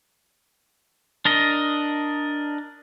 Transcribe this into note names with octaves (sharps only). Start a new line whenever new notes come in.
D4 A#4 D#5